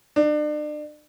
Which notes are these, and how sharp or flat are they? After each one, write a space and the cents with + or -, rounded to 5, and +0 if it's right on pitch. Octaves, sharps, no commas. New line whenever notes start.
D4 +35